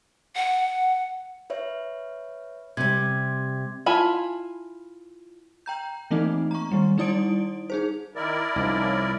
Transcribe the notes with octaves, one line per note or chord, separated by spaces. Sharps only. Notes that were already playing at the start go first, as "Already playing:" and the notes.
F#5
B4 C#5 E5
C3 G3 G#6
E4 F4 G#5 A5 B5
G5 A#5 G6
E3 A3 A#3 C4 D#4
A#5 C#6
D#3 G3
G3 D#4 E4 D5 D#6 D7
D#4 G#4 C5
D#3 E4 A#4 D5
C2 F3 C#4 D#4